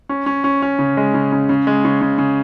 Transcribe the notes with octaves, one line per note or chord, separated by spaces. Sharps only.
C#4
C#4
C#4
C#4
C#3
G#3
C#3
C#3
C#3
G#3
C#3
C#3
C#3